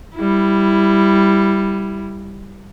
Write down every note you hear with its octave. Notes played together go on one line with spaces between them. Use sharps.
G3 E4